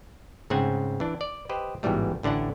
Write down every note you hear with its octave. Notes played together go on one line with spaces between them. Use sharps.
G#2 C#3 A3 C4 F#5 G#5
E3 D4
D5
G4 B4 C5 D#5
A1 G#2 B2 E3 G3 A3
A1 D3 D4 E4 F#5